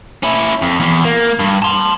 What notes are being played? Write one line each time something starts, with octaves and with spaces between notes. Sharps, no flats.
C#4 E4
F2
E2
A#3
G2
A5 C6